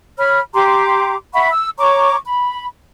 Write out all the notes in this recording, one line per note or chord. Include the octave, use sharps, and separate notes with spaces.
C#5 B5 F6
G4 A#5 C6 D6
E5 F#5 B5 C#6
E6
C#5 A#5 C#6 D6
B5